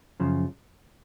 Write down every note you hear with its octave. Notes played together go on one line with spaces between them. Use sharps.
F#2 C#3 F3